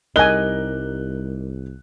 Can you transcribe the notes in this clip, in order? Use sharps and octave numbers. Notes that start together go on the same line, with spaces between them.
C2 G3 D#4 A#4 D#5 G#5 F#6 G7